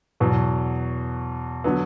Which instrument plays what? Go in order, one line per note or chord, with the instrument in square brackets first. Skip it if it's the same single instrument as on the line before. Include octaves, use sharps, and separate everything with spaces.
[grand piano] E2 B2 F#3
D3 F#3 B3